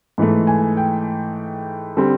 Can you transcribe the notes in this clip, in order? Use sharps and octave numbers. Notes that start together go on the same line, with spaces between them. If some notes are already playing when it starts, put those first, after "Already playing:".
G#2 E3 A3
G#5
G5
D3 G3 C4